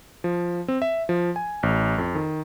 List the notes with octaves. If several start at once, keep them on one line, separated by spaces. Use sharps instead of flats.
F3
C4
E5
F3
G#5
A1
F2
D#3